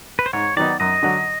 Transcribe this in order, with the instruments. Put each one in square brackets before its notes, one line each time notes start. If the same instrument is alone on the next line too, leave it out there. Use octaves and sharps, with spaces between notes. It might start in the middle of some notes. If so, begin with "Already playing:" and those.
[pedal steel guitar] B4
C5
[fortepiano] G#2 [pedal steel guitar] C#5
[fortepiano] D#3 F#3 B3 D#4 [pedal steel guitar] D5
[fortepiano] F#2 [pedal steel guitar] D#5
[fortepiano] D3 F#3